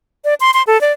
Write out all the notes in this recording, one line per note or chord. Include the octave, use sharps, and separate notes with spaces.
D5
C6
C6
A4
D5